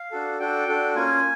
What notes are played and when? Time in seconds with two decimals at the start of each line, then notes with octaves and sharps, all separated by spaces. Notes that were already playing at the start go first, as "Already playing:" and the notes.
Already playing: F5
0.11 D4 F#4 A4
0.40 D4 F#4 A4 G5
0.68 D4 F#4 A4
0.95 A#3 C#4 F4 G#5